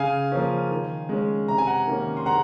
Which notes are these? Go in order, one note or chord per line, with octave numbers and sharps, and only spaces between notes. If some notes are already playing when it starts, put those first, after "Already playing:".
Already playing: C#3 F5 G#5
F3 A#3 C#4
D#3
G#3 C#4
C3 A#5
G#5
F#5 A#5
D#3 A#3 C#4
C6
C#3 F#5 A#5